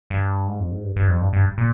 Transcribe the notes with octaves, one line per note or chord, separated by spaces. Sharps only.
G2
G#2
F2
G#2
G2
G2
F2
G2
G2
A#2